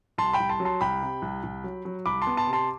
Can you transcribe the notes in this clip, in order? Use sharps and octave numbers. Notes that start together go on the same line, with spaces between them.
C2 A5 C6
G5 B5
C2
A5 C6
F#3
A5 C6
C2 G5 B5
C3
C2
C2
F#3
F#3
C2 B5 D6
A5 C6
B3
A5 C6
C3
A5 C6